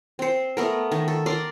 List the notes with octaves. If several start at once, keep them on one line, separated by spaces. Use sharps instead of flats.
C4 C5
A3 B3 A#4
D#3
A4
A#4 D5 A#5 C6